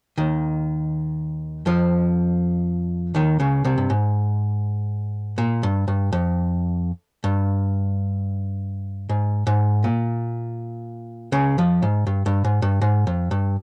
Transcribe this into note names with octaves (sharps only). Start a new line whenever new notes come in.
D#2 D#3
F2 F3
D#2 D#3
C#2 C#3
C2 C3
G2
G#2
A#2
G2
G2
F2
G2
G#2
G#2
A#2
C#2 C#3
F2 F3
G#2
G2
G2
G#2
G2
G#2
F2
G2